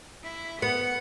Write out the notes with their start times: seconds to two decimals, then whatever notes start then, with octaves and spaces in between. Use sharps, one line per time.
0.23 E4
0.62 B3 F#5 C#7